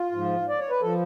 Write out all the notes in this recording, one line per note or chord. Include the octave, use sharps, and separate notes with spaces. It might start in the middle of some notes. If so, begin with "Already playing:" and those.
Already playing: F4
G#2 F3
D5
C#5
B4
F3 A4